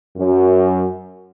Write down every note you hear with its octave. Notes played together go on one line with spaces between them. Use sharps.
F#2